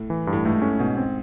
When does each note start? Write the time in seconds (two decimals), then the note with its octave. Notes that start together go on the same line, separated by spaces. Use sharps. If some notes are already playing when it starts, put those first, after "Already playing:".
Already playing: A2
0.10 E3
0.27 G2
0.33 A2
0.45 G#2 A3
0.62 A2 C#4
0.79 G#2 B2
0.97 C4